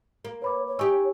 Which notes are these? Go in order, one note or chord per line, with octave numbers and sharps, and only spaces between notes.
A#3
B4 C#5 B5 D6
C#5
D#4 G4 G#5 C#6 E6